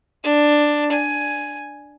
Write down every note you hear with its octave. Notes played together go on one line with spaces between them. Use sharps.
D4
G#5